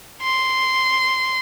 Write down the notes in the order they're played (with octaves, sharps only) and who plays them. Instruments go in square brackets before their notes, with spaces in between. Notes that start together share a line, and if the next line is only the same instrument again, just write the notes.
[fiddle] C6